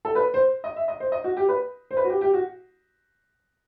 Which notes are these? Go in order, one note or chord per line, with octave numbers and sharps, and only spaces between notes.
A4
B4
C5
D#5
E5
D#5
C5
D#5
F#4
G4
B4
C5
B4
F#4
G4
G4
F#4